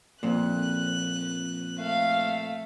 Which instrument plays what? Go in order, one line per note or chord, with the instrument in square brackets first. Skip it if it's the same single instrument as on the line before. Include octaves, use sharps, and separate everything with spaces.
[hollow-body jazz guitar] F2 A#2 [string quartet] F#6
[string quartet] A3 [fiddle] F5